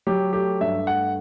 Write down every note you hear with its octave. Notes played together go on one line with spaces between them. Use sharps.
F#3 G4
A3 G4
G2 E5
A3 F#5